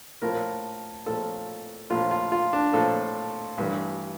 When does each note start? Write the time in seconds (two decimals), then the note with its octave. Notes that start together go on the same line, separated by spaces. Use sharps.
0.22 A#1 A2 F3 A#4
1.06 A#1 A2 F3 A4
1.90 A#1 A2 F3 F4
2.11 F4
2.32 F4
2.53 D4
2.73 A#1 A2 F3 A4
3.58 A1 G2 E3